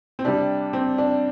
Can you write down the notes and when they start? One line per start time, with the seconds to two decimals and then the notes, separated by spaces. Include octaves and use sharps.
0.19 C4
0.25 C3 G3 D4
0.73 C4
0.98 D4